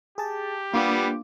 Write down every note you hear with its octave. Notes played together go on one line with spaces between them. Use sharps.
G4 G#4 A5
G3 A#3 B3 D4 F4 B4 D6